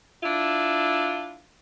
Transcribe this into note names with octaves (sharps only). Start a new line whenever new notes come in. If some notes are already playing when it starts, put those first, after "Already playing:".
D4 E4 F4